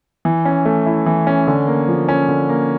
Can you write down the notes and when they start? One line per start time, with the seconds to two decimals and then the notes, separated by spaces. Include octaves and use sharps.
0.25 E3
0.45 C#4
0.65 A3
0.86 E4
1.06 E3
1.27 C#4
1.47 D3
1.67 A#3
1.88 F3
2.09 C#4
2.29 D3
2.49 A#3